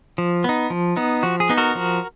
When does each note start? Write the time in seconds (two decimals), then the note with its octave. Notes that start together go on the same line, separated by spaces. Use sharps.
0.18 F3
0.44 B3 D#4
0.70 F3
0.97 B3 D#4
1.23 F3 F#4
1.40 G#4
1.49 B3 D#4
1.57 F#4 A#4
1.75 F3